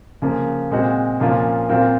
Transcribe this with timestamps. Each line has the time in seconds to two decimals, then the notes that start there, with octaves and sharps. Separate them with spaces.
0.22 C#3 F3 A#3
0.70 A#2 G#3 C4 F#4
1.20 A#2 F3 A#3 C#4 F4
1.69 A#2 F#3 C4 F4 A#4